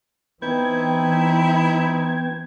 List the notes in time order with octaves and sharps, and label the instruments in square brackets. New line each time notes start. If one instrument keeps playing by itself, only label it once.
[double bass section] E3 [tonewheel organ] B3 G5 G#6 [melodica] C4 D#4 [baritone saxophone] E4